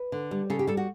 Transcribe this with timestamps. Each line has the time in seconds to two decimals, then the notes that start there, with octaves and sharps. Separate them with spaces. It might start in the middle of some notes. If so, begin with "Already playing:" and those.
Already playing: B4
0.12 D3
0.31 G3
0.50 C#3 A4
0.59 G4
0.67 G3 A4
0.77 F#4